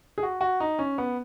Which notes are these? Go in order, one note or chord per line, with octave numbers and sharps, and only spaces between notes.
G#4
F#4
F#4
D#4
C#4
B3